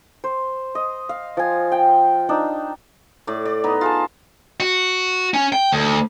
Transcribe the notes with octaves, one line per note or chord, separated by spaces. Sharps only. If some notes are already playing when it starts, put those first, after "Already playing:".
C5
D#5
F5
F3 G#5
G5
D4 D#4
A2 D5
D5
B3 D#4
F4 G#4 A5
F#4
C#4
G5
D2